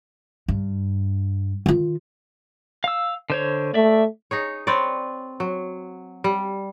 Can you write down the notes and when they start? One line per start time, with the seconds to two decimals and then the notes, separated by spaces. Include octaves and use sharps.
0.48 G2
1.66 D#3 F4
2.84 F5 E6
3.30 D3 C5 C#5
3.74 A3 D5 E5
4.31 D#4 G#4 C#5
4.67 C4 B4 C#5 D5
5.40 F#3
6.24 G3